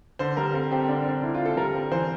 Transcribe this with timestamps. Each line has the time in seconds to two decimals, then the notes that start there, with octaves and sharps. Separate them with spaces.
0.19 D3 C5
0.37 G3 A#4
0.53 C4 A4
0.72 C4 G4
0.88 D3 D4
1.06 C4 D4
1.22 D3 E4
1.35 F4
1.40 D3
1.45 A4
1.57 G3 A#4
1.74 C4
1.91 E3 C5